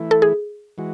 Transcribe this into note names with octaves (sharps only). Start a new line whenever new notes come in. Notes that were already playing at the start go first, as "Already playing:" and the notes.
Already playing: E3 A3 E4
A4
G#4
E3 G#3 F#4